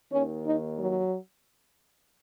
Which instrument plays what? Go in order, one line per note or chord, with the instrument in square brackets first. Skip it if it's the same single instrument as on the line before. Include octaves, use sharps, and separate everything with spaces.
[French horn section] D#2 D#3 C#4
D#4
F#3